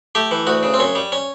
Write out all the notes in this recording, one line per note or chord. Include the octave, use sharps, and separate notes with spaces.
A3 G4
E3
D2 F#4
C#3
C4
F#2 C#4
G3
C#4